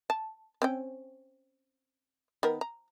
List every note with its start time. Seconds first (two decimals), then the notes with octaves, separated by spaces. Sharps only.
0.10 A5
0.62 C4 C#4 G5
2.43 D#3 B3 A#4
2.61 A#5